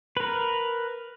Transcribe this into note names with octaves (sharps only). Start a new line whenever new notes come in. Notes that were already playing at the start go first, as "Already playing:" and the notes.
A#4 B4